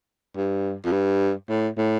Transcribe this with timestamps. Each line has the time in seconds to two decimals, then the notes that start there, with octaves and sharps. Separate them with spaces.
0.36 G2
0.84 F2
0.92 G2
1.49 A2
1.77 A2